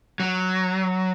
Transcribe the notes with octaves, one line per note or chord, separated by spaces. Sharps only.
F#3